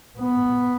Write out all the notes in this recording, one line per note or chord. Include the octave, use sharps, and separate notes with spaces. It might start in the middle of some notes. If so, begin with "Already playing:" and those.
B3